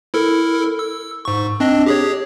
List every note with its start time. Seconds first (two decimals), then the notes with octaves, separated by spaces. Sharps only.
0.14 E4 A4 A#4
0.79 E6
1.25 G#2 C#6
1.60 C4 D4 D#5
1.86 G4 G#4 C#5